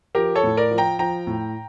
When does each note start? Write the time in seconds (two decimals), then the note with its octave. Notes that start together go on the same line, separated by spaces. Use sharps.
0.15 F3 G4 A#4
0.35 A4 C#5
0.43 A2
0.57 A#4 D5
0.71 F3
0.78 G5 A#5
0.99 F3 G5 A#5
1.27 A2